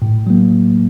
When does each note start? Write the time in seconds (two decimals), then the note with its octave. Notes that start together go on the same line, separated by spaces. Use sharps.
0.02 A2
0.27 F#3 A#3